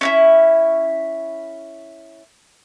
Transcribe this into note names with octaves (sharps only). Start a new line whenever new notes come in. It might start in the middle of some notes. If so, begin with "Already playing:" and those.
C#4 D#4 E4